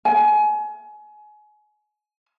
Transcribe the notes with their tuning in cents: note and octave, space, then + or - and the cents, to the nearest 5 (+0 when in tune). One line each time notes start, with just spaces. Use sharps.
G#5 +30